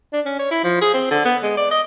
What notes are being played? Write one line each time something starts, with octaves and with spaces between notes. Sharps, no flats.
D4
C#4
C#5
E4
F3
G#4
C4
D3
B3
G#3
D5
D#5